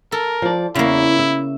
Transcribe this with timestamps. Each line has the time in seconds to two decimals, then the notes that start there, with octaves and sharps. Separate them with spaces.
0.12 A4 A#4
0.42 F3 D5
0.75 E2 C#3 A#3 E4
1.19 E5